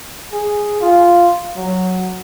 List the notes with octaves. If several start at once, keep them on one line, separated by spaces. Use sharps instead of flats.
G#4
F4
F#3